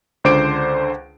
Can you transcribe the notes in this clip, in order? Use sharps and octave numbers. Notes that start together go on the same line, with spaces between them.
C#2 D3 C5 D6 D7